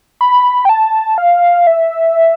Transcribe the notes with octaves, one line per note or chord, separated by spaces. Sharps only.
B5
G5
A5
F5
E5